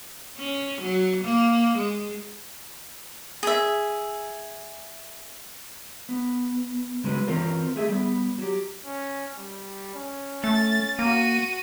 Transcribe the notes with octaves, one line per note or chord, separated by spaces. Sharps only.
C#4
F#3
A#3
G#3
G#4 E5
B3
C#3 F#3 G#3 B3 C#4 B4
E3 C4 C#4 F4 A#4 C5
A3 G#4 E5
G3 B3
F#3 G4
C#4
G3
C#4
A3 A6
A#3 F#4 D#7